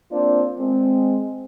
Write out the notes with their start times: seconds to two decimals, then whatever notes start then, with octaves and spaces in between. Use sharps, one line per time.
0.11 A#3 C4 D4 F4 C5 D5
0.58 G#3 C4